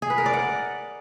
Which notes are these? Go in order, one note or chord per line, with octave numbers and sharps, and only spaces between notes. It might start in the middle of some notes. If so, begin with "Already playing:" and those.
G#4
B4
A#4
D5
F#5